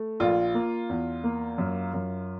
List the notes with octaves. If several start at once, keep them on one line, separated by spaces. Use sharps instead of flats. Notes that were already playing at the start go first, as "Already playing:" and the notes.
Already playing: A3
A#1 F4
A#3
E2
A#3
F#2
F#2